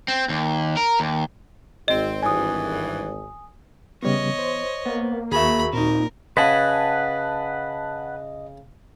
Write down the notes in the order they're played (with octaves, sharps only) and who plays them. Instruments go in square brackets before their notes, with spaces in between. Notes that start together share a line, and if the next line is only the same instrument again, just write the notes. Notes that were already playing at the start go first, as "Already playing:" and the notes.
[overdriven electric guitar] C4
D#2
A#4
D#2
[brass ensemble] G#1 [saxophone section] C4 [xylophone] D#5
[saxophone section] G2 E3 [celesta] G#5 D#6
[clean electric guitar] E2 [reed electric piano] C#3 G3 B3 [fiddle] C#5 D#5
[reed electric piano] C5
[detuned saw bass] A#3 [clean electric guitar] B3
[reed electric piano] D#2 F#4 C#6 [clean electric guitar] G#4 A#4 E5 [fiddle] B5
[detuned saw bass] A#2 [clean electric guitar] C4 D#4 [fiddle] A#4
[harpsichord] C#3 [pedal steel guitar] B4 G#5 [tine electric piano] D#5 [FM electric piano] F#5 A5 F#6